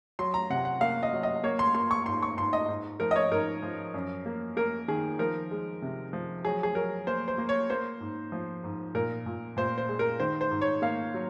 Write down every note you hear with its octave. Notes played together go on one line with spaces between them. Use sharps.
F#3 C6
A#5
C3 F#5
F#5
A#3 F5
D#5
F#3
D#5
A#3 C#5
C6
A#3 C6
C#6
G#2 C6
C#6
G#2 C6
D#5
G#2
F3 A#4
D#5
C#5
G#2 A#4
F3
F#2
A#3
A#3 A#4
D#3 G#4
F3 A#4
G#3
C3
F3
F#3 G#4
G#4
F#3 A#4
A#3 C5
C5
A#3
C#5
A#3 C5
G#2
F3
G#2
A#2 A#4
A#2
A#2 C5
C5
G#3
A#4
D#3 C5
C5
G#2
C#5
A#3 F5
F#3